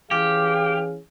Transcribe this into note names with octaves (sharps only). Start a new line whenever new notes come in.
E3 C#4 G4 G#4 F5